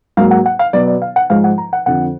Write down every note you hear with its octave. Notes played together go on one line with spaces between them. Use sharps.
G#2 F#3 A#3 F5
F#5
F#5
F5
B2 F#3 B3 D5
D5
F5
F#5
G#2 F3 G#3 F5
F#5
A#5
F#5
F2 D3 F3 F#5